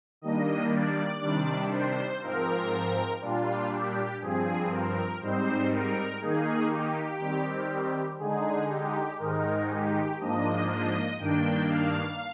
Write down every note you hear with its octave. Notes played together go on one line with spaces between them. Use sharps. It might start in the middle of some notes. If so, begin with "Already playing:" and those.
D#3 G3 A#3 D4 D#5
D5
C3 D#3 G3 D4
C5
G#2 F3 C4 A#4
A#2 G3 D4 F4
G4
G2 F3 C4 G#4
A#4
G#2 G3 C4 D#4 C5
A#4
D#3 A#3 D#4 G#4
G4
D#3 G3 C4
D3 G#3 D#4 G#4
G4
G#2 D#3 G#3 D#4 A#4
G4
G#2 F3 A#3 D4 D#5
D#5
G2 D#3 A#3 D4 G5
F5